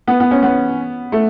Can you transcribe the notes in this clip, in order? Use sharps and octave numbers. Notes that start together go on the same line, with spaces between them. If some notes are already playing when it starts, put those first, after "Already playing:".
B3
B3
C#4
B3
A3